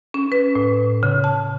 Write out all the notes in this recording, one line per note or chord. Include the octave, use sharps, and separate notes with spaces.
C#4
B4
A2
C#3
A5